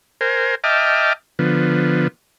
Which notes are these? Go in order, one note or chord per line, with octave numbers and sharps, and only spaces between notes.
A#4 C5 G#5
D#5 E5 G5 A5 D6 F6
D3 F3 B3